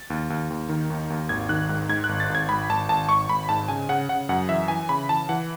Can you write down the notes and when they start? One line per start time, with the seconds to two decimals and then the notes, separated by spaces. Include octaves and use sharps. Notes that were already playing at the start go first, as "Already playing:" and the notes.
Already playing: A6
0.10 D#2
0.30 D#2
0.50 D#2
0.69 D#3
0.90 D#2
1.10 D#2
1.29 G#1 G#6
1.49 D#3 F#6
1.69 G#2
1.89 G#2 G#6
2.04 F#6
2.09 G#1
2.20 A6
2.30 G#1 G#6
2.49 G#1 B5
2.70 G#1 A5
2.89 G#1 A5
3.09 G#1 C#6
3.29 G#1 B5
3.49 G#2 A5
3.68 C#3 G#5
3.89 C#3 F#5
4.09 C#3 F#5
4.29 F#2 F#5
4.49 E3 E5
4.68 E3 G#5
4.89 C#3 B5
5.09 E3 A5
5.29 E3 F#5